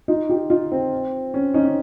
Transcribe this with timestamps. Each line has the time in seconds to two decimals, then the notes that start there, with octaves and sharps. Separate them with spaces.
0.08 D#4 F4
0.29 F4 G4
0.50 D#4 F4
0.72 C4
1.34 C#4
1.54 C#4 D#4
1.65 C#4